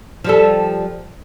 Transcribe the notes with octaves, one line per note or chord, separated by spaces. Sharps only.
F3 G3 A4